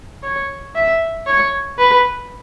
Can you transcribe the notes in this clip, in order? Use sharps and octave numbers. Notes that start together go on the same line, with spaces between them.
C#5
E5
C#5
B4